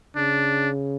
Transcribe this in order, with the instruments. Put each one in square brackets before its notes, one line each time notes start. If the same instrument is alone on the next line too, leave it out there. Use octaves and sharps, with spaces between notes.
[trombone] C#3 [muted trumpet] D4